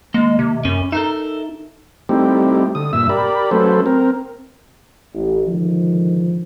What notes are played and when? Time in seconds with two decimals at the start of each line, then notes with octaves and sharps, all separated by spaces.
0.14 D#2 G#3 A#3
0.39 C3
0.65 F#2 C#4
0.92 D#4 A4 A#4 E5
2.09 G3 A3 C4 D#4 E4 G4
2.75 D3 D#6
2.93 G2 A#2 E5 E6
3.09 G4 A#4 D5 B5
3.51 F#3 A3 C#4 A4 B4 C5
3.86 C4 A#4
5.14 A1
5.47 G#2 D3 D#3 F3